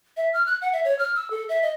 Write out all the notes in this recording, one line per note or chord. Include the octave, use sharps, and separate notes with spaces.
E5
F6
F#6
F#5
E5
C#5
F6
E6
A4
E5
D#5